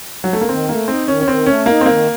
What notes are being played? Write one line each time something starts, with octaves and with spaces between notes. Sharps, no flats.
F#3
A3
A#3
D#3 C4
A3 A#3
C4 D#4
D#3 C#4
C#4
D#3 C4
A3 C#4
A#3 D#4
C4
D#3 A#3